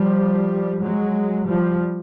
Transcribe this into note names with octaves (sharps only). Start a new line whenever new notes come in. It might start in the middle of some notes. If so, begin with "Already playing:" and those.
Already playing: F3 G3
F#3 G#3
F3 G3